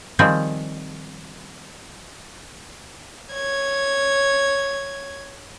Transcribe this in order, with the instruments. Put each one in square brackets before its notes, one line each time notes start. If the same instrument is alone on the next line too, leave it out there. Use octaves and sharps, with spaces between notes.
[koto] D#3 F3 G3 C4 G#4
[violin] C#5 G#6